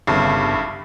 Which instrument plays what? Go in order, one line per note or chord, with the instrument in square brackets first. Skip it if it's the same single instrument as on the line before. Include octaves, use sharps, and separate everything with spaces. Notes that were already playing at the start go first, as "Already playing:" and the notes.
[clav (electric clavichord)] G1 C#3 [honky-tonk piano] C2 G2